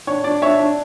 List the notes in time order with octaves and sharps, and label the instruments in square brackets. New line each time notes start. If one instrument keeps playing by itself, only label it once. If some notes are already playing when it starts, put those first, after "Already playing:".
[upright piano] D4 C#5
D4 D5
D4 C#5 E5
D4